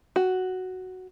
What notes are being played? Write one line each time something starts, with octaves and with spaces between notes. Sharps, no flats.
F#4